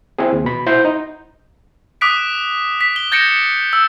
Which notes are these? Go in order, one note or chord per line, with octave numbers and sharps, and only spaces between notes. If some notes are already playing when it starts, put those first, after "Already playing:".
C4 E4 G#4
D#2
B2 B5
E4 C5 F#5 G6
D#4
D6 D#6 F#6 B6 D7
B6
G7
G6 A6 A#6 C#7 D7 E7
E6